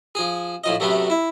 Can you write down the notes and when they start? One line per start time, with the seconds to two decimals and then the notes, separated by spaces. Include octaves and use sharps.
0.15 F3 G#4
0.64 A2 F3 D#5
0.80 F#2 C3 A3 B3
1.10 E4